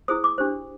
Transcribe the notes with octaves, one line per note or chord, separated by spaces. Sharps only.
E4 G#4 C5 D#6
D6
D4 G4 C5